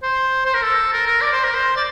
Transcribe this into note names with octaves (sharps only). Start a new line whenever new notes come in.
C5
C5
A#4
A4
A#4
A#4
D5
C5
A#4
C5
D5